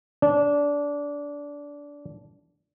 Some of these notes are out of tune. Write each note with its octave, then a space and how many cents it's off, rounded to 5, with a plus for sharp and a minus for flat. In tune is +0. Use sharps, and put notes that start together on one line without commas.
D4 -20